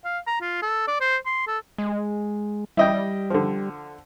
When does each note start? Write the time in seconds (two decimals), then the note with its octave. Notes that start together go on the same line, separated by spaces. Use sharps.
0.05 F5
0.27 A#5
0.41 F4
0.62 A4
0.88 D5
1.01 C5
1.26 C6
1.47 A4
1.78 G#3
2.77 G3 E4 D#5 G5
3.30 D3 F3